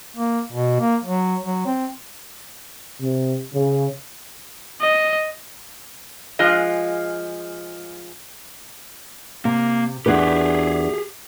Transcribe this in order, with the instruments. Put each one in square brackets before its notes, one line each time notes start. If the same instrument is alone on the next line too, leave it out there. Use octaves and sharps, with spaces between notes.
[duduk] A#3
B2
A#3
F#3
F#3
C4
[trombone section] C3
C#3
[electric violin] D#5
[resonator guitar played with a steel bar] F3 G#3 F4 G#4 D#5
[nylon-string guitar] C3 [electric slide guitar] A#3
[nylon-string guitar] E2 D4 B4 [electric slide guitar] G4 G#4